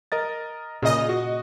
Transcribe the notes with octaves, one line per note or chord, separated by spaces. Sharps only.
A#4 D#5 A6
A#2 C#3 D#5
F#4